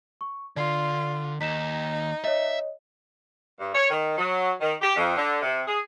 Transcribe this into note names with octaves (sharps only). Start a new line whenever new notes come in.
C#6
D3 F4 D5 C7
D#2 D#4 B6 E7
C#5 D#5 E5
G2
C#5
D#3
F#3
D#3
G4
F2
D3
C3
G#4